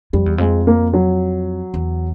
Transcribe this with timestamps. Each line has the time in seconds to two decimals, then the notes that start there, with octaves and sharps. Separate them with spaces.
0.13 F2 G3
0.26 E2
0.38 F2 G#3
0.67 A#3
0.93 F#3
1.74 E2